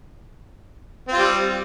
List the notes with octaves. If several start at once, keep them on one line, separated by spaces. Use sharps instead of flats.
G3 C4 F4